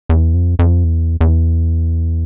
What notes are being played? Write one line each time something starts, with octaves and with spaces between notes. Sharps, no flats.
E2
F2
F2
E2
E2